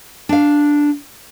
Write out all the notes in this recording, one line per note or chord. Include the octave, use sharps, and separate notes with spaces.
D4 F5